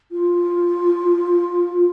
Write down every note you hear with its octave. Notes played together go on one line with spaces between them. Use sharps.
F4